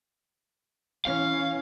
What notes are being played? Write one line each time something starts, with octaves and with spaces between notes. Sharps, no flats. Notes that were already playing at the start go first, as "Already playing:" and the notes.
E3 C#4 F5